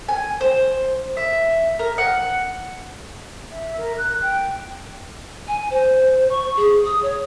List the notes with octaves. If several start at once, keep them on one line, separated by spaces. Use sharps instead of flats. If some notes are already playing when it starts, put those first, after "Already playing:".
G#5
C5
E5
A#4
F#5
E5
A#4
F#6
G5
G#5
C5
C#6
G#4
D#6
C#5